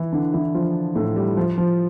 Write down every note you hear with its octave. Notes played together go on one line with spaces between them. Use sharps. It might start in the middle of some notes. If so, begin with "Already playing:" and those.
Already playing: E3 E4
D3 D4
E3 E4
F3 F4
A2 A3
G3
F3
F3